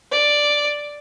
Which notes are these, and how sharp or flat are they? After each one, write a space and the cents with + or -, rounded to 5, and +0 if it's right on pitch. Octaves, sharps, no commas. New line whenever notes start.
D5 +0